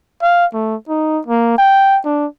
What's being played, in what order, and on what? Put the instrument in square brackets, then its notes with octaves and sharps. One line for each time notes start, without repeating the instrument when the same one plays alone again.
[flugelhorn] F5
A3
D#4
A#3
G5
D4